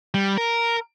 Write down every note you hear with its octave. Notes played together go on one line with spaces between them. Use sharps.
G3
A#4